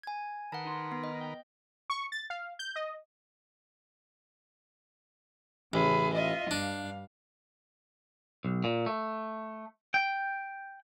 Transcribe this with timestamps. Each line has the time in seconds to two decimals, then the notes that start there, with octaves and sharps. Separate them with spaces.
0.03 G#5 G#6
0.52 D#3 A#4 B4 F#5 A5
0.65 D#4 C6
0.92 B3
1.04 D#5
1.21 G5
1.90 C#6
2.12 A6
2.30 F5
2.59 G6
2.76 D#5
5.73 A1 C#3 G#4 B5
6.13 F4 D#5 E5
6.51 G2 D4 F5
8.45 B1
8.64 A#2
8.86 A3
9.94 G5